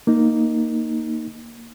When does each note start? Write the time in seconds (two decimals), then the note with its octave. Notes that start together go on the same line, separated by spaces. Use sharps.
0.07 A#3 D#4